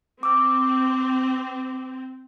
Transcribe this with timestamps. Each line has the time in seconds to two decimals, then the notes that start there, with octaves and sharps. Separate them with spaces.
0.23 C4 D6 E6